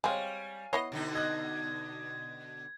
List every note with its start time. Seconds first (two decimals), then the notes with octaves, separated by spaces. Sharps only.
0.04 G3 G#3 C4 C#5 F5 G#5
0.73 B3 E4 C#5 D#5 C7
0.92 B2 D3 D#4
1.15 D#5 F#6 G#6